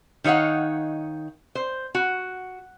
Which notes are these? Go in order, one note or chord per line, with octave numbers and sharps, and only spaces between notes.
D#3 D#4 C#5 F5 F#5
C5
F#4